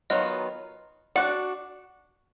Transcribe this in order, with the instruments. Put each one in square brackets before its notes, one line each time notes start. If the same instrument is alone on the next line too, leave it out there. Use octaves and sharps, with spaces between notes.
[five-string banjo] D#3 F#3 B3 F4 [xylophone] D#5
[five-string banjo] D4 F#4 D5 [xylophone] F#5